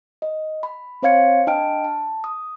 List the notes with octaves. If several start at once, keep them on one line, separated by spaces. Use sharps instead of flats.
D#5
B5
C4 C5 C#5 F5 G#6 C#7
D4 D#5 G5 A5 F6 D7
A5
D#6